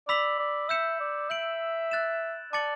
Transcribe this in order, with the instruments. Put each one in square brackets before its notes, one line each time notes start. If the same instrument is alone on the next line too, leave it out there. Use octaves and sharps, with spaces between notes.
[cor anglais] D5 [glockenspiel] B5 E6 B6 F#7
[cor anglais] D5
[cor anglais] E5 [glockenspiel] E6 G6 C#7 E7
[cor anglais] D5
[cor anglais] E5 [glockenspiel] G6 D7 F#7
[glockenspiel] F#6 A6 E7
[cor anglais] D5 [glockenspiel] A5 D6 A6 C#7 F#7